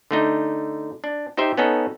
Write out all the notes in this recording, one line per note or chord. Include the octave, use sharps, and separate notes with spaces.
D3 A3 D#4
D4
D#4 G4 C5 E5
B3 C#4 D#4 A4